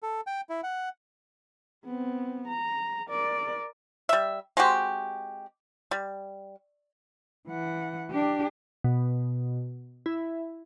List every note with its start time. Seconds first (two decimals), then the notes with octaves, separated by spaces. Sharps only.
0.03 A4
0.27 G5
0.49 E4
0.63 F#5
1.85 B3 C4
2.48 A#5
3.09 A#4 D5
4.09 G3 E5
4.57 G#3 C4 F#4 G4
5.91 G3
7.48 E3 F#5
8.11 D4 G4
8.84 B2
10.06 E4